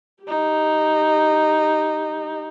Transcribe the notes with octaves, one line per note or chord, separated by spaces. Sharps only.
D#4 G4